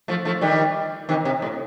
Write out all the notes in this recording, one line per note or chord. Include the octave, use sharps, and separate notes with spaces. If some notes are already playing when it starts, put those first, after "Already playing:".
F3 A3
F3 A3
D#3 G3
C3 D#3
C3
A2